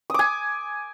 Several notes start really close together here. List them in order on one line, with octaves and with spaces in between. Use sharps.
D#6 D6 G#5